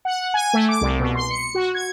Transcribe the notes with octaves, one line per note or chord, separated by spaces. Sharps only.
F#5
G#5
A3
D6
C2
B2
C6
C#7
F#4
G#6